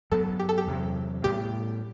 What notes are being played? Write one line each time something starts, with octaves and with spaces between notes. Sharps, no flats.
G2 F#3 B3 A4
G4
A4
G4
E2 C3 F#3
A2 G3 B3 G4